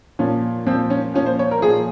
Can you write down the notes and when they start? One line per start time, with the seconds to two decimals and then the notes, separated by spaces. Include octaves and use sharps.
0.19 A#2 F3 C#4
0.67 A#2 F3 C4
0.90 C#4
1.14 A#2 F3 C#4
1.26 C5
1.39 C#5
1.51 A#4
1.62 A#2 F3 G#4